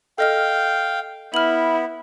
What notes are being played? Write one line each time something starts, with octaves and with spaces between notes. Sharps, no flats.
A4 D#5 F5 G5 F6
B3 E4 F6 F#7